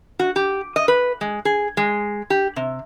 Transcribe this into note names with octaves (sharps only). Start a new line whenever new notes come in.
F#4
G4
D#5
B4
G#3
G#4
G#3
G4
C3